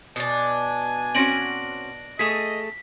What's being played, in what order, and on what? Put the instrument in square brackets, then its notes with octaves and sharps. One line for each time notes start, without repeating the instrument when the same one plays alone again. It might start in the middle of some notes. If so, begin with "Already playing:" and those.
[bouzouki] B2 D4 [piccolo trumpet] G#5
[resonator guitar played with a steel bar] C4 C#4 F#4 [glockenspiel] A#6 D7 F#7
[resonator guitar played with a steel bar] A3 G#4 [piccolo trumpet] D#5 [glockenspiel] B6